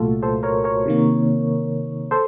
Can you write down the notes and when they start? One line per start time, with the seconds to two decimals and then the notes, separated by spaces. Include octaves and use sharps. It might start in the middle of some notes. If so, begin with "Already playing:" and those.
Already playing: C2 A#2 F#3 A3 F4 F#4 A4
0.23 A4 C5
0.43 A#4 C#5
0.64 A#4 C#5
0.86 C3 D#3 A#3
2.11 A4 C5